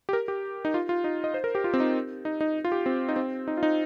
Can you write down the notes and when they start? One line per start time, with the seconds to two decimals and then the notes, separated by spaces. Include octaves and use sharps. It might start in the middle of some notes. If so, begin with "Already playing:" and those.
0.09 G4
0.13 A#4
0.28 G4
0.65 D#4
0.74 F4
0.89 F4
1.04 D#4
1.24 D#5
1.34 C5
1.44 A#4
1.55 G4
1.64 F4
1.74 C4
1.80 D#4
2.25 D#4
2.41 D#4
2.65 F4
2.72 G4
2.86 C4
3.09 D#4
3.16 C4
3.48 D#4
3.57 F4
3.63 D#4